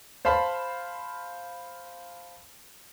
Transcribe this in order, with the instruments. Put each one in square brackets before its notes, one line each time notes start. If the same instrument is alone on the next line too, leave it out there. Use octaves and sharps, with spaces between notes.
[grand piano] C5 F5 A5 B5